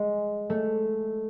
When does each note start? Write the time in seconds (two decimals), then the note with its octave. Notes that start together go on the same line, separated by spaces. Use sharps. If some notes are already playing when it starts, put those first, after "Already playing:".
Already playing: G#3
0.50 A3